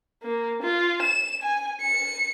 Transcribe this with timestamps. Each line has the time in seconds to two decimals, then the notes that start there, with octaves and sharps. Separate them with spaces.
0.23 A#3
0.63 F4
1.02 E7
1.43 G#5
1.81 C#7